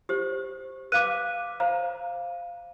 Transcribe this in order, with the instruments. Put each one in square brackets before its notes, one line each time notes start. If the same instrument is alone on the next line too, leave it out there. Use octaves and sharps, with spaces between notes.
[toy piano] G4 C5
[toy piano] B4 F5 D6 [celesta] F#6 D#7
[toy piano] C5 A#5 [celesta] F5